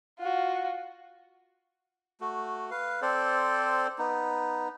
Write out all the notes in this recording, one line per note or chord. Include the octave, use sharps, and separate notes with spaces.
F4 F#4
A3 F#4
B4 F5
C4 A4 C5 D5
B3 D#4